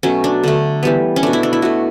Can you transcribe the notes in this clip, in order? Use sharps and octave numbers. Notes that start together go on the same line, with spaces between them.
B2 F#3 A3 C#4
D4
D3 A3
E3 G3 B3
C#4
B2 A3 D4
E4
D4
E4
B2 A3 F#4